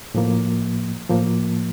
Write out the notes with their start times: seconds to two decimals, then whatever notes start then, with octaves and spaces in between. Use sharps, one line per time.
0.15 A2 F3 A#3
1.09 A2 F3 A#3